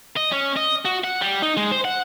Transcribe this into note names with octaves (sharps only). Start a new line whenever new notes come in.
D#5
C#4
D#5
F#4
F#5
G3
D#4
G#3
C5
F#5